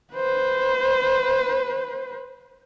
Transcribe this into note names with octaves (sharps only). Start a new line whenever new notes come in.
B4 C5